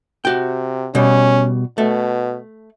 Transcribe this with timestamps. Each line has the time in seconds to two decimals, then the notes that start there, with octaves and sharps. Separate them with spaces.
0.25 C3 F#4 G5
0.95 B2 G3 C#4
1.78 B2 A3